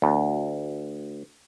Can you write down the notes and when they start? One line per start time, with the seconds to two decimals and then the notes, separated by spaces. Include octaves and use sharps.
0.02 D2